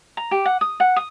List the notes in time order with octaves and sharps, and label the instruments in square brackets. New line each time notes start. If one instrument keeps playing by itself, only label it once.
[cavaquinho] A#5
G4
F#5
D#6
F#5
D#6